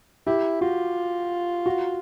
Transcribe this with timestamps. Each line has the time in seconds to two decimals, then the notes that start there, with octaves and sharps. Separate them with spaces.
0.27 E4 G4
0.61 F4 F#4
1.66 F#4